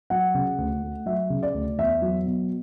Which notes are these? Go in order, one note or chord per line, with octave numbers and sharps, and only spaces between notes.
F#3 F#5
C#3
D2
A3
F#3 E5
C#3
D5
D2
E2 E5
F#3
B2